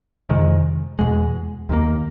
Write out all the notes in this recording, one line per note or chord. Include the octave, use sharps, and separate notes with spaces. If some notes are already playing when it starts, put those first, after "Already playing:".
F2 C3 D#3 G#3
E2 B2 G#3
D#2 D#3 G3 A#3